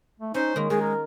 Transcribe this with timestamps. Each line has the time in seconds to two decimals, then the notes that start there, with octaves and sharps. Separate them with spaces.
0.20 A3
0.34 C#4 D#4 C5
0.56 D#3 G#3 A#3
0.70 D#3 G#3 G#4
0.81 A#4